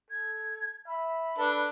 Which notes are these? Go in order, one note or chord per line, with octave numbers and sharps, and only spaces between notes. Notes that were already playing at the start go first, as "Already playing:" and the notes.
A4 G#6
E5 B5
D4 A4 B4